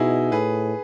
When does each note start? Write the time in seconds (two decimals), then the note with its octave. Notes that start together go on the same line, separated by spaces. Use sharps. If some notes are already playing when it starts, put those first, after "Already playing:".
Already playing: B2 D#4 E4 F#4 G#4
0.32 A2 G#4 B4